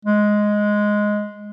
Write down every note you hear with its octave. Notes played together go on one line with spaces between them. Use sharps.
G#3